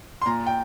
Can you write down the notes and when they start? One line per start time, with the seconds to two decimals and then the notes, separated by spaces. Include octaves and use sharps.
0.22 C6
0.26 A#2 A#5
0.47 G5